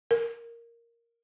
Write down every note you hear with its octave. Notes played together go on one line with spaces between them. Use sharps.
A#4